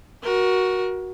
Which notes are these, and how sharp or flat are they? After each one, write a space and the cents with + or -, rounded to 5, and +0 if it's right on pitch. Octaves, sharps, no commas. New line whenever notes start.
F#4 +0 A#4 +25